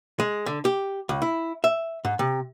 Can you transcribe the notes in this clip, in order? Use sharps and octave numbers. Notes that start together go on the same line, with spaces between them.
G#3
D3
G4
C#2
E4
E5
G#2
C3